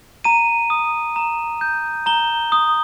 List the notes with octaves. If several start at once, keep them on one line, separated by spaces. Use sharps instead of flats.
A#5 D#7
D#6
A#5
G6
A#5 G7
D#6